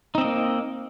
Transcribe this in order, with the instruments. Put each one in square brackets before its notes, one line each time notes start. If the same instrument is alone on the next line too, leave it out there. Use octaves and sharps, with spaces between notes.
[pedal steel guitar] D#4
C4
D#5
A#3